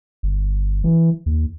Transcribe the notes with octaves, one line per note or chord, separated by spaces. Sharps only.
G1
E3
D#2